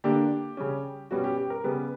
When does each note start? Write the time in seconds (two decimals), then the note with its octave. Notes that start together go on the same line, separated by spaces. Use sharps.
0.04 D3 A#3 D4 G4
0.57 C#3 G3 C#4
1.11 B2 G3 C#4 F#4
1.24 G4
1.38 G4
1.50 A#4
1.64 C#3 G3 B3 B4